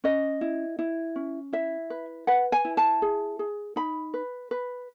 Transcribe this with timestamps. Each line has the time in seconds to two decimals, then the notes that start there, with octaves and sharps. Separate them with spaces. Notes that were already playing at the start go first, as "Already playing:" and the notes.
0.04 C#4 D#5
0.41 E4
0.79 E4
1.16 C#4
1.53 E4 E5
1.90 B4
2.27 B4 F#5
2.52 G#5
2.65 E4
2.77 A5
3.02 G#4
3.39 G#4
3.76 D#4 B5
4.14 B4
4.51 B4